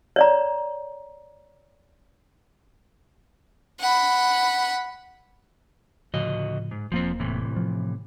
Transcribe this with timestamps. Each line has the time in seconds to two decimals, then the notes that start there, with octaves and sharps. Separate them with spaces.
0.16 C#5 D5 A#5
3.80 F#5 B5
6.14 D2 A2 C#3 F3 F#4 D#5
6.71 G#2
6.92 E1 F3 A#3 C4
7.20 A2 C3 E3
7.56 F3